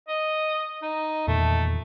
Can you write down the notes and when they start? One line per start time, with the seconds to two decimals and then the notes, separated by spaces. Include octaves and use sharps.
0.08 D#5
0.82 D#4
1.27 E2 A#2 D#3 A3